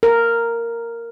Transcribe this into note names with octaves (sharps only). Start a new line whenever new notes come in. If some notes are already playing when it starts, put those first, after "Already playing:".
A#4